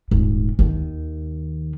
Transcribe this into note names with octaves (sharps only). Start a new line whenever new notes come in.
D#1 G#2
D#2 D#3